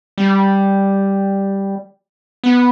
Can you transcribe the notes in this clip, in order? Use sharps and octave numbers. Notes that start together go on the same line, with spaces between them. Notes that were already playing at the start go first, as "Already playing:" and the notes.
G3
B3